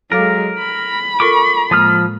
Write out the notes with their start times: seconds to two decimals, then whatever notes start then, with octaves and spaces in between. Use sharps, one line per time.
0.12 F#3 G#3 A4 A#4 F5 D6
0.58 B5
1.20 F4 A4 A#4 C#6 D6
1.71 A2 F3 G#3 A#3 D#6 F6